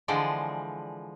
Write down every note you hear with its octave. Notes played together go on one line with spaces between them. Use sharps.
D3 E3 F3 G#3 D5